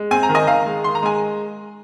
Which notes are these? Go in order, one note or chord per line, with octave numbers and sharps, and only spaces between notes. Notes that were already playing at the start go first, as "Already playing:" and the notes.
Already playing: G#3
C4 G#5
A#5
D#3
D#5 G#5
D#3 F5 A#5
G#3
D#3 C6
A#5
G#3 G#5